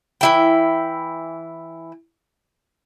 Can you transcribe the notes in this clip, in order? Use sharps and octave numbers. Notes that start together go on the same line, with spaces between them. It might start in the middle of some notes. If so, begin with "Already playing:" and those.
E3 E4 G5